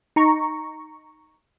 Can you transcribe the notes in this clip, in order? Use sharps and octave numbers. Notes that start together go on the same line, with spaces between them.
D#4 A#5 C#6